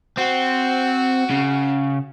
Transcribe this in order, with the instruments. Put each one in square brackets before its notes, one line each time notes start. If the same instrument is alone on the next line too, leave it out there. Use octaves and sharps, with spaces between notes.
[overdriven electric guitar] C4 [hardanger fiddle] F#4
[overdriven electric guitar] C#3